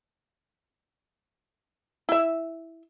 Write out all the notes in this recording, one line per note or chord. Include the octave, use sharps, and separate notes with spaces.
E4 E5